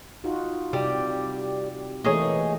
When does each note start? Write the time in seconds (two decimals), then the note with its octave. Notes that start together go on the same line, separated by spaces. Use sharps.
0.24 D#4 F4 F#4
0.73 C3 G3 G4 D5
2.04 E3 A3 A#3 D#4 G#4 C#5